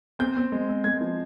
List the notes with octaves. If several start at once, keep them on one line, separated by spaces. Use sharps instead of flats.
C4 G6
C4
G#3
C4
G#3 G#6
F3